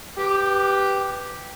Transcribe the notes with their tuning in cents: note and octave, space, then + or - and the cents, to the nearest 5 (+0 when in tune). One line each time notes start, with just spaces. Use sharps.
G4 +0 B4 +0 D6 +35